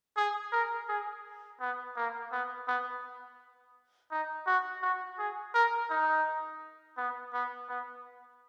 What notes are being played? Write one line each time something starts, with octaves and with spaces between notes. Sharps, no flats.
G#4
A#4
G#4
B3
A#3
B3
B3
D#4
F#4
F#4
G#4
A#4
D#4
B3
B3
B3